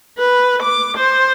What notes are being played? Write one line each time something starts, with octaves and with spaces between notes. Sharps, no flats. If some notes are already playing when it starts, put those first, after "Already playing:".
B4
D6
C5